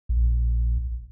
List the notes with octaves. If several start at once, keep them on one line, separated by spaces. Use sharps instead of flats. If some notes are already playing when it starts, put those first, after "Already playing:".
A#1